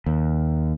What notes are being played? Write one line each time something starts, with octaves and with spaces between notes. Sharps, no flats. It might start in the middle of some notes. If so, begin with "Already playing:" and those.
D#2